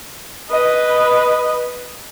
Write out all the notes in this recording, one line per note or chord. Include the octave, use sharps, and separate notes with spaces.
B4 D#5